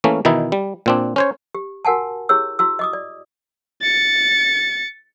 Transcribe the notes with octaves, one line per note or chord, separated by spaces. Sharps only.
E3 A3 A#3 C#4
B2 D#3 E3 D#4 E4
G3
A#2 C4 D4
C#4 C5 C#5
G4
F#4 A#4 F#5 G#5 A5
E4 G4 G#4 C#5 E6
E4 F#4 E6
D#5 D6 D#6
D5
A6 C#7